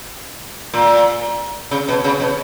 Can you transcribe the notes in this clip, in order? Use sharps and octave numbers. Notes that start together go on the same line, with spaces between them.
A#2
C#3
B2
C#3
B2